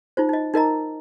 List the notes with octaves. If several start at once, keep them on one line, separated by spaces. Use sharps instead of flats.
D#4 F4 C5
D#4 D#5
D#4 A#4 D#5 A#5